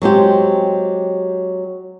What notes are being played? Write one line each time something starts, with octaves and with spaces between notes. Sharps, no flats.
F#3 G#3 C4 G4